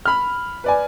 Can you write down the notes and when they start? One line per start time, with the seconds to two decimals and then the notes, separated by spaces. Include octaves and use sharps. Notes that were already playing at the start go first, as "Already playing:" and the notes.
0.06 B5 F6
0.64 B4 D5 G#5